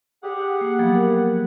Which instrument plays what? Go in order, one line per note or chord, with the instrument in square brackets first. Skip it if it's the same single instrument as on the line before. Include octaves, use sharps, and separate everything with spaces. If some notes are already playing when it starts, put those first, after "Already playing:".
[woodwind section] G4 G#4 F#5
[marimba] A#3
F3 F#3 B3
A#4